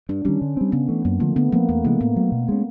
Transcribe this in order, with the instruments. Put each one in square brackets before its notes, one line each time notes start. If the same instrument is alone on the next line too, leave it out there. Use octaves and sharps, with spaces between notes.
[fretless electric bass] G2 [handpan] D4
[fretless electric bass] D#3 G3 [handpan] C#4
[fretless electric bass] D3
G3 C4
[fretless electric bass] C#3 [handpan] B3
[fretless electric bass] E3 A3
[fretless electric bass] F#2 [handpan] A#3
[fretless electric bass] D3 F3 [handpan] A3
[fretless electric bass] D3 [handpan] B3
[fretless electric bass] F3 A3 C4 [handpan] A#3
[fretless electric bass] E2 [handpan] A3
[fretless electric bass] C3 E3 G#3 [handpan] A#3
[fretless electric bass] A2 [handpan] B3
[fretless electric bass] F#3 A3
B2
G#3 C#4